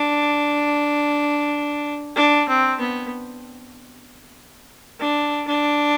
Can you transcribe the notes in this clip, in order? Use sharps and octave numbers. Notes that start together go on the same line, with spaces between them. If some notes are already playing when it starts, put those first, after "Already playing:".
Already playing: D4
D4
C4
B3
D4
D4